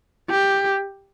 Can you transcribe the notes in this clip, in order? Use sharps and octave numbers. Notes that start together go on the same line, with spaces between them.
G4